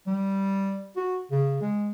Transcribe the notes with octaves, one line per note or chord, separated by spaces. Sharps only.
G3
F#4
C#3
G#3